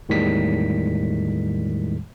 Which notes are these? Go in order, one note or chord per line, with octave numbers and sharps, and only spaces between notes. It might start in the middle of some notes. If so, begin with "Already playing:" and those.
E2 A2 D#3 G3 G#3 B6